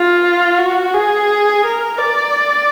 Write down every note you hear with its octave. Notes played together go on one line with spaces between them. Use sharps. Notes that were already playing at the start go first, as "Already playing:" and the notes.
Already playing: F4
F#4
G#4
A#4
D5